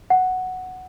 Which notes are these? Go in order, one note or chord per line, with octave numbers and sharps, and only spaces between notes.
F#5